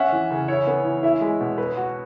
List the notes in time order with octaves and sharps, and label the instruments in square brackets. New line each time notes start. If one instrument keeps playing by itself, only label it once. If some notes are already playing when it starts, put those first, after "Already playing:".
Already playing: [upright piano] C#4 [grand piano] E5 F#5
[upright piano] E3
C#3
[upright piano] E4 [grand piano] C#5
[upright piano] B3
E3
[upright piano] E4 [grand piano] E5
[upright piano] G#3
B2
B4
F#4